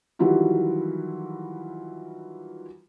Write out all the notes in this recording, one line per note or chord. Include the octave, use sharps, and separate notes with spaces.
D#3 E3 F#3 G3 E4 F4